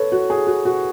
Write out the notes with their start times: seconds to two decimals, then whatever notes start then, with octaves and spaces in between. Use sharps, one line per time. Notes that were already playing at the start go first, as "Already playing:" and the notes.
Already playing: A4 B4 C#5
0.12 F#4
0.30 G#4
0.47 F#4
0.65 F#4